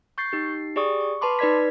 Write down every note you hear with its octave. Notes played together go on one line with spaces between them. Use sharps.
C#6 G6 A6 C7
D#4 G4 C7
G4 G#4 D5 C#6 D#6
C#6
B4 A5 B5 C6 D6
D#4 B4 D5 G#6 B6